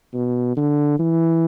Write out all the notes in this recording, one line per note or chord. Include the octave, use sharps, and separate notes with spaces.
B2
D3
E3